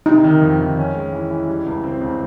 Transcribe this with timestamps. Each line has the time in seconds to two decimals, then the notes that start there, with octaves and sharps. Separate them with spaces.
0.06 C3 D#4
0.24 D#3
0.41 F2
0.60 D#3
0.77 C#4
0.95 G#3
1.13 E3
1.30 E3
1.48 G3
1.66 C#2
1.83 C4
2.01 C#2